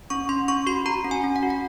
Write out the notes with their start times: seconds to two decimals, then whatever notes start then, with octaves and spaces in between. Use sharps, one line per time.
0.10 C#4 C#6
0.29 C#4 C6
0.48 C#4 C#6
0.67 F#4 C6
0.86 F#4 A#5
1.05 C#4
1.11 G#5
1.23 C#4
1.36 F#5
1.43 F#4
1.50 F#5